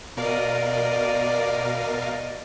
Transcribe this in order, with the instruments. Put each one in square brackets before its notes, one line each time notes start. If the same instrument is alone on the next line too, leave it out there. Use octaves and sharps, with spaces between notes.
[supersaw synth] B2 A#4 F5 [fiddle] D5 D#5